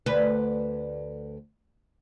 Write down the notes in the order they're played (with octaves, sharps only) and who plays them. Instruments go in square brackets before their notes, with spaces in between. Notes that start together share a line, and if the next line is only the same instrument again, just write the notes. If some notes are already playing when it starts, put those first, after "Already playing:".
[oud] D2 B4